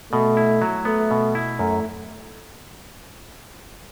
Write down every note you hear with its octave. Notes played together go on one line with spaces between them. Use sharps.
B2 A3
E4
F#3
A3 B3
B2
E4
F#2 A3